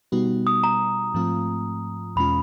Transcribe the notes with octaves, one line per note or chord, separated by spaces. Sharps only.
B2 G3 B3 D#4 F#4
D#6
A#5
G#2 F3 A3 C4 F4
E2 B2 G#3 C#4 F4 B5